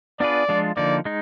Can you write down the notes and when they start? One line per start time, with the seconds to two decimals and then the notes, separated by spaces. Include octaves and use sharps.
0.20 B3 D4 F4 G#4 B4 D5
0.49 F3 G#3 D4 F4
0.77 D3 F3 A#3 D#4 D5
1.05 G#3 D#4